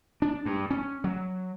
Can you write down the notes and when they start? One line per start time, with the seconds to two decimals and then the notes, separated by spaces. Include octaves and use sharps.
0.22 D4
0.46 G2
0.71 C#4
1.04 F#3